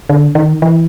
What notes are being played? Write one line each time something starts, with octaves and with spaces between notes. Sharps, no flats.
D3
D#3
E3